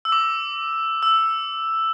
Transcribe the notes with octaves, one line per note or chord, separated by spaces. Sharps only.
E6
D6
E6